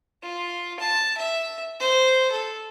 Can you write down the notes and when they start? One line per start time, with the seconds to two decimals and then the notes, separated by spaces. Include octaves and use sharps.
0.23 F4
0.80 A5
1.18 E5
1.80 C5
2.32 A4